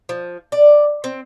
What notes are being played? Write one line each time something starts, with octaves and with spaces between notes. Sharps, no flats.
F3
D5
C4